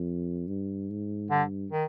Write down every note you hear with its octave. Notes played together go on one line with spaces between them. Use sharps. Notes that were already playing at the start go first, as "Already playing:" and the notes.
Already playing: F2
G2
G#2
G2 D3
D#3